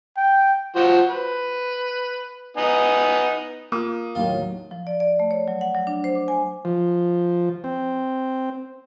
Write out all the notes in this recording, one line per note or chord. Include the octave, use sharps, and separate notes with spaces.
G5
F3 F#4 C5
B4
B3 D#4 G#5
A#3 F4 D#6
D#2 A2 D#3 F#3 F4
F3
D5
D5
A3
C#5
F#3
F#5
F#3
D4
C5
D6
G#5
F3
C4